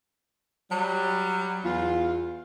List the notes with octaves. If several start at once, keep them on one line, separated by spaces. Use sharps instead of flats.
F#3 G3
E2 F4